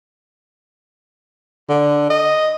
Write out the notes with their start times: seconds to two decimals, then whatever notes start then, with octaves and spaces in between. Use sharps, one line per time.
1.69 D3
2.10 D#5